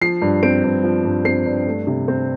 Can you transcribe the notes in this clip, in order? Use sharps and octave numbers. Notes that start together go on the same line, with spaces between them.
F3 C7
G2
C4 D7
G2
F3
G2
C4 C7
G2
A3
C3
C4